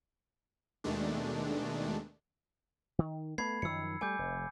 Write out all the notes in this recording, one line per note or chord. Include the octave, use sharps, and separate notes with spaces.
D#2 B2 D#3 G#3 A3 D4
D#3
A3 B3 B5 G#6 C7
F#2 D#3 F3 E6 C#7
G3 A3 G#5 D6 G6
F1